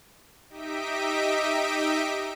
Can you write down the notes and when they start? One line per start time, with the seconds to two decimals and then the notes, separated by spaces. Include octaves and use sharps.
0.49 D#4 G4 D#5 E5 B6 D7